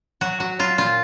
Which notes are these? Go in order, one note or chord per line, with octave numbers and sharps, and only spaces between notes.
F#3 F#4
F#3 F#4
F#3 F4
A#2 F4